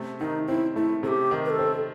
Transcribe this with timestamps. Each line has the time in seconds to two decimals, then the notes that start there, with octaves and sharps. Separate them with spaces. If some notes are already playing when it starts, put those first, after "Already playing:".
Already playing: C3 A3
0.20 D#3 D#4
0.47 C4 E4
0.76 A3 E4
1.03 C3 A4
1.07 G4
1.31 D#3
1.45 B4
1.50 A4
1.59 C4